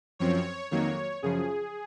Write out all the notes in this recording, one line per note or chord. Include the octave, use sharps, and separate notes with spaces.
F#2 F3 C4 C#5
F2 D#3 F#3 A#3 C#5
F#2 C#3 F3 G#4